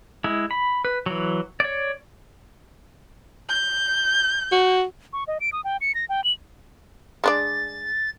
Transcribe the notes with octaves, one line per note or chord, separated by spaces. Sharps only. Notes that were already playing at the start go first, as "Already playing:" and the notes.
G#3 E4
B5
B4
E3 F#3
C#5 D5
G6
F#4
C#6
D#5
D7
D#6
G5
C#7
A#6
G5
F#7
G#3 D4 D5 A6